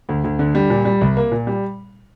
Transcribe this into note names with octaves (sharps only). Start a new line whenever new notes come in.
D2
D2
D3
G3
A#2
G3
C2
A#3
A#2
G3